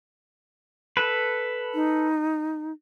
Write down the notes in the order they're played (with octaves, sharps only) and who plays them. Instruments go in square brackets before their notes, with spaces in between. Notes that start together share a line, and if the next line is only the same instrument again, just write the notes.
[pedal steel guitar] A4 B4
[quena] D#4